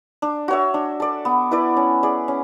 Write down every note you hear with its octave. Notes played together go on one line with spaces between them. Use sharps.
D4
F#4 C#5 E5
D4
A4 D5
B3
E4 B4 D5
C#4
G#4 D5
C#4